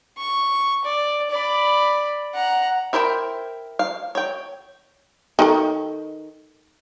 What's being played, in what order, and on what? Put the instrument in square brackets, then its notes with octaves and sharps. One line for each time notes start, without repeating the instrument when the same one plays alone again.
[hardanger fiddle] C#6
D5
D5 B5
F#5 A#5
[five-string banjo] E4 A#4 C5 C#5 G5
F5
C#5 G5
[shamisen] D#3 D#4 A4